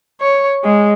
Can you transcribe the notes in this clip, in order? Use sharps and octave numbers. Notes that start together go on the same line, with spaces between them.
C#5
G#3